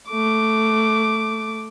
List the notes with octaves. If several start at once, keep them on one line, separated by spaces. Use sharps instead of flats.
A3 D6